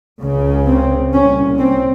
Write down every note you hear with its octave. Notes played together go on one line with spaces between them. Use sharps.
C#2 C#3
C4
C2 A#2 C#4
C4